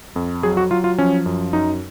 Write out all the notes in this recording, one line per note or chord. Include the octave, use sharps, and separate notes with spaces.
F2
F#3 G#4
F#4
F#3 F4
F4
F3 C#4
F#2
F#2 D#4